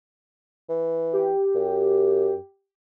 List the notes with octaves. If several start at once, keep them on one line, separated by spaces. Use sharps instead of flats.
E3
G4
F#2